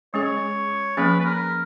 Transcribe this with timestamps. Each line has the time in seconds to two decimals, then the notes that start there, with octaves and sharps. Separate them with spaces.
0.14 G#3 C#4 G#4 C#5
0.97 F3 A#3 C#4 G#4 B4
1.20 B4
1.25 A#4